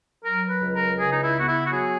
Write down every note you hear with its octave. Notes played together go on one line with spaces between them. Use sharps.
F#3 A#4
B4
C#2
A#4
C#3 G#4
D#4
E4
B3 F#4
E4
F#4
F#3 G#4